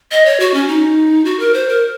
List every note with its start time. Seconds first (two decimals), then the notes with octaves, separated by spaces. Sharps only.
0.12 D#5
0.25 C#5
0.40 F#4
0.54 C#4
0.68 D#4
1.25 F#4
1.39 A#4
1.54 C5
1.69 A#4